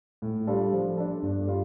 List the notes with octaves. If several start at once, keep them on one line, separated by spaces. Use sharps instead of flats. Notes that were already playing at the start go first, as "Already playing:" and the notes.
A2
G3 D4 F4 A4
F3
D4 A4
G2
G3 F4